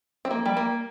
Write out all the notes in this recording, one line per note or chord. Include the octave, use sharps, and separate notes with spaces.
C4
A#3
G3
A#3